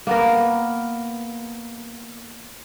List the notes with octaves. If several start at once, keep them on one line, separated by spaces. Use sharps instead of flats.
A#3 B3 A#4